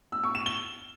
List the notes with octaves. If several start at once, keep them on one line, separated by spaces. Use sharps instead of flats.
E6
C#6
E7
G7